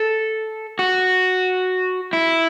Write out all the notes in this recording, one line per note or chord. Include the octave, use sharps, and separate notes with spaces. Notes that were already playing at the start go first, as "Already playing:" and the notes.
Already playing: A4
F#4
E4